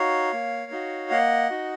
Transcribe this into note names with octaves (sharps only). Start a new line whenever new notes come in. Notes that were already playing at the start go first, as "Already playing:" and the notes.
Already playing: D#4 F#4 C#5 F5
A#3
D#4 F#4
A#3 D#5 F#5
D#4 F#4